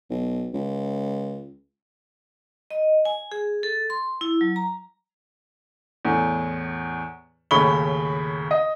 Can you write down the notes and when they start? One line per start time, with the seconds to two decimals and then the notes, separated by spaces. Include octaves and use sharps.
0.10 B1
0.54 C#2
2.70 D#5
3.05 G#5
3.32 G#4
3.63 A4
3.90 C6
4.21 E4
4.41 F#3
4.56 A#5
6.05 E2 A2
7.51 D#2 A2 C#3 B5 C#6 G7
8.51 D#5